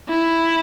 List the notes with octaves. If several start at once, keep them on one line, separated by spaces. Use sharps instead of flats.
E4